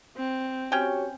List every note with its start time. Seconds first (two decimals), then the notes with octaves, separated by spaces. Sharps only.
0.17 C4
0.72 C#4 F#4 G4 C#5 G5